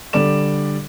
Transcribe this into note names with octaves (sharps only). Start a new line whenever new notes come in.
D3 G3 D5 D6 E7